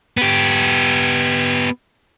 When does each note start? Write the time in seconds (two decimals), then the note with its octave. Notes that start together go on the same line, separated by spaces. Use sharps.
0.17 B3 G4